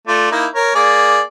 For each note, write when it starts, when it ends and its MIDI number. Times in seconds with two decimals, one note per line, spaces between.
0.08 0.27 57
0.08 0.27 65
0.08 0.27 74
0.31 0.46 58
0.31 0.46 63
0.31 0.46 64
0.55 0.70 70
0.55 0.70 73
0.75 1.20 58
0.75 1.20 68
0.75 1.20 74